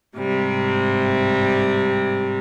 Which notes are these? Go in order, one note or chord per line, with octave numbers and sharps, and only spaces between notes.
G#2 C3 G3